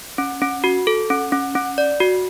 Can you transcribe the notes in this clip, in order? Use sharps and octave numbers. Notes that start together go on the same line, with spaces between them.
C#4
C#4
F#4
A4
C#4
C#4
C#4
D5
F#4